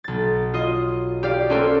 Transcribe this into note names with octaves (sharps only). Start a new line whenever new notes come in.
B1 A6
F4 D#5
G4 D5 F5
C#4 F#4 A4 A#4 C5 D5